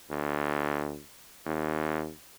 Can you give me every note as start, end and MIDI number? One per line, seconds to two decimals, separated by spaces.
0.10 1.00 38
1.46 2.11 39